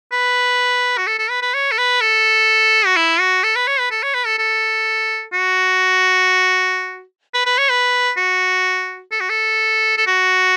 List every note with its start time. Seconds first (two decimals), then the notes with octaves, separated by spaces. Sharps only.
0.12 B4
0.98 F#4
1.07 A4
1.19 A4
1.30 B4
1.42 B4
1.54 C#5
1.72 A4
1.78 B4
2.01 A4
2.86 F#4
2.96 E4
3.20 F#4
3.44 A4
3.56 B4
3.68 C#5
3.79 B4
3.91 A4
4.03 C#5
4.14 B4
4.26 A4
4.39 A4
5.33 F#4
7.34 B4
7.46 B4
7.58 C#5
7.70 B4
8.17 F#4
9.12 A4
9.21 F#4
9.29 A4
9.98 A4
10.07 F#4